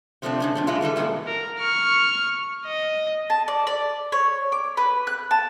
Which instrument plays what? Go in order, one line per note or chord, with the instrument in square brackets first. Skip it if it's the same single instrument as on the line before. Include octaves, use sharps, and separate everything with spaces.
[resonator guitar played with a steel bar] C3 F3 A3 B3 C4 D4
G#2 C3 C#4
F#2 A#2 D4
E3 G#3 E4 F4
G#2 E3 G3 A4
F#2 A#2 G#3 B3 E4
[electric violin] A#4
C#6 F6
D#5
[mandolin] A5
D5
D5
C#5
D6
B4
F#6
A5